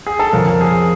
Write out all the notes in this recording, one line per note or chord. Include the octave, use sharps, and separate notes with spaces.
G#4
A4
F2 C#3 F3 A#4
G#4